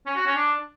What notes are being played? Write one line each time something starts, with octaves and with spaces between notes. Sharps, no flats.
C#4
F#4
C#4
D4